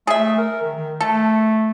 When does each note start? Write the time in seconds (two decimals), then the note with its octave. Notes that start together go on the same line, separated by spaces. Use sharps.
0.07 A3 G#4 E5
0.38 A#4
0.62 D#3
0.76 D#3
1.01 A3 A4